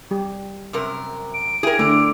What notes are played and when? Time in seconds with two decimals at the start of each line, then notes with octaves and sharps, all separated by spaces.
0.11 G3 G4
0.73 F#2 C3 A#4
1.34 D7
1.63 E4 G4 G#4 A#4
1.79 D3 A3